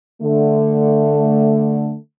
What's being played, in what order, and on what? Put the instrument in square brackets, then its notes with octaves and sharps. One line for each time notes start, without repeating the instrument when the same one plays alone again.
[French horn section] D3 A3